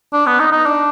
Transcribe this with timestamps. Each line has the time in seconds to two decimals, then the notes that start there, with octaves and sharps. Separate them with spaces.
0.13 D4
0.26 B3
0.40 D#4
0.52 D#4
0.66 D4